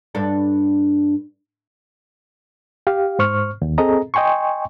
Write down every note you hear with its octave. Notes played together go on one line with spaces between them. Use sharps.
G2 D4 A4
G4 F5
G#2 C5 C#6 F6
D#2
C4 G#4 A4 D#5 A#5
D#5 G5 G#5 C6 C#6